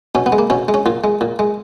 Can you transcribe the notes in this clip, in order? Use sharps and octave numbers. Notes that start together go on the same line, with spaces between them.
B2 C#4
B3
G#3
A#3
B2 C#4
G#3
C#4
A#2 F4
G#3
A#2
G#3